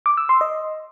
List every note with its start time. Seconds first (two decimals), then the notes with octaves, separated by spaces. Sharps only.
0.06 D6
0.17 E6
0.29 C6
0.41 D#5